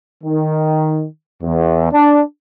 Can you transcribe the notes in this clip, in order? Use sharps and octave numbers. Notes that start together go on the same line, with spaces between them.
D#3
E2
D4